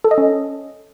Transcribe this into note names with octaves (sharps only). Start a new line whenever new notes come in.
A4
D#5
C#4